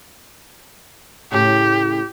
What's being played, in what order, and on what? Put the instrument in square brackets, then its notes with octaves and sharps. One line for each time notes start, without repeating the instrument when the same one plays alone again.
[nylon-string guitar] A2 C#3 [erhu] G4